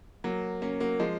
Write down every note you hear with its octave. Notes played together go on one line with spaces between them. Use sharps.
F#3 A#3
A#3 C#4
F#3 A#3
F3 G#3